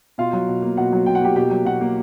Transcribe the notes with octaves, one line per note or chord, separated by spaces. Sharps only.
B2 F4 F5
F#3
B2
A#3
B2 F#4 F#5
F#3
B2 G5
F#5
A#3 G4 G5
B2 G4 G5
F#3
B2 F#4 F#5
A#3